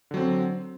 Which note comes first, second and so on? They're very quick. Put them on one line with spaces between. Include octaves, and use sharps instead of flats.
D3 F#3 C4